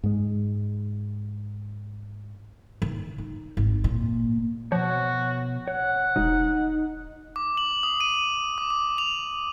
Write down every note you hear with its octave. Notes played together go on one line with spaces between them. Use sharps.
G#2 G#3
D#3
D#4
G#1
A#2
B2 F3 F#4 C#5
C#5 F#5
E1 D#4
D6
F#7
D#6
D#7
D6
D6
F7